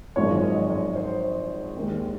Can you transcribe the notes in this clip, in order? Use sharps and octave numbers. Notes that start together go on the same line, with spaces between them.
G#1 F#2 F3 G#3 C#5
D#5
C#5
C5
D#2 D#3 G#3